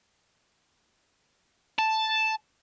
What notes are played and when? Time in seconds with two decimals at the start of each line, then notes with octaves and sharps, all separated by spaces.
1.79 A5